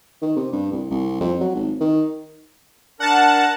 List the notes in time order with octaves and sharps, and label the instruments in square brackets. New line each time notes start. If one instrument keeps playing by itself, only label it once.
[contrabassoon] D#3
C3
G2
C2
C2
F2
F#3
G#1
D#3
[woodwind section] D4 A#4 [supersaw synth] F#5 A5